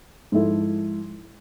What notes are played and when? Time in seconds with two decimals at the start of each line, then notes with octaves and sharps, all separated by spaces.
0.32 G#2 F3 E4 A4